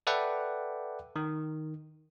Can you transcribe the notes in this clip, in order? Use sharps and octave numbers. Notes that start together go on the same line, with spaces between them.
A4 B4 D5 E5 F#5 G5
D#3